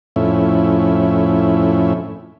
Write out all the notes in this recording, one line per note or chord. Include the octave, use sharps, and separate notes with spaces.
F2 A2 C#4 E4